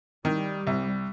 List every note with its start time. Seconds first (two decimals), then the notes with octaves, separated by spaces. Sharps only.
0.25 D#3 G3
0.67 C2